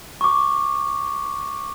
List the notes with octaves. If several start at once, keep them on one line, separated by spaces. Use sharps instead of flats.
C#6 D6